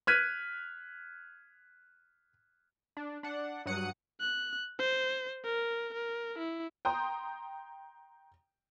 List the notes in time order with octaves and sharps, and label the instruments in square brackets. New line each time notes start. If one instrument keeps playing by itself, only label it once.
[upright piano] F6 F#6 G#6 B6 D#7
[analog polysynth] D4
D4 F#5
G2 F#3 F#5 D#6 C#7
[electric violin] F#6
C5
A#4
A#4
E4
[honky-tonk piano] G5 A#5 C6 D#6 G6